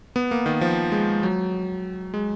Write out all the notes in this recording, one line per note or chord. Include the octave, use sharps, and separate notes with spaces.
B3
A#3
D#3
F3
G#3
F#3
G#3